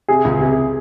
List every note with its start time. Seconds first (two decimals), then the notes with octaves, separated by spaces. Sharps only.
0.08 C3 G#4
0.25 C#2
0.41 C3 G#4